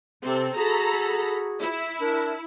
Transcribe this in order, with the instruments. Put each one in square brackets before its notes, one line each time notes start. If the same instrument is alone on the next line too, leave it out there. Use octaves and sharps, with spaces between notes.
[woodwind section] C3 [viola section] C4 A4
[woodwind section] F#4 G#4 [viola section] A4 A#5 B5
[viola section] E4
[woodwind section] D4 A#4